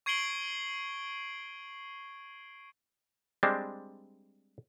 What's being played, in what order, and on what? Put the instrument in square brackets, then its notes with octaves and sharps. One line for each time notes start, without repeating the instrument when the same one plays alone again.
[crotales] C#6 G#6 C7 D7 F#7 G7
[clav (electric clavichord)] G3 G#3 C4 D4